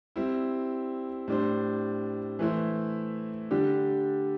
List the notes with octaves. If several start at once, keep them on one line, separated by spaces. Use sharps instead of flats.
G3 C4 E4
A2 G3 D4 C5
E3 A3 E4 C5
D3 G3 D4 G4